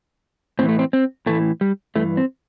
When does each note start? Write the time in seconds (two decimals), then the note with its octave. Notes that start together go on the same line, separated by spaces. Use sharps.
0.59 A2 E3 C4
0.69 A3
0.79 C4
0.93 C4
1.26 A2 E3 A3
1.61 G3
1.96 G2 E3 A3
2.17 C4